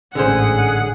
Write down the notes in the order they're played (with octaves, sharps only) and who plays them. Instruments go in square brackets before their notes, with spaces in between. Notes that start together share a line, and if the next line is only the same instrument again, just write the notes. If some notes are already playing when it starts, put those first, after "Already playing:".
[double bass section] A1 G#2 [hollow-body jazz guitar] D3 C#4 C5 [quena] G#4 [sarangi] F#5